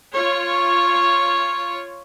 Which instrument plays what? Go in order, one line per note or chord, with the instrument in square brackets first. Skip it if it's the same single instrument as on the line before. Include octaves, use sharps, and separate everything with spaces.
[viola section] F4 C#5